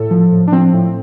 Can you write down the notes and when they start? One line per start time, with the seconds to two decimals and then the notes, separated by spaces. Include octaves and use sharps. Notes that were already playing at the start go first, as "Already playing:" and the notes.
Already playing: A2 A4
0.11 F3
0.32 A2
0.47 D4
0.52 F3 C4
0.73 A2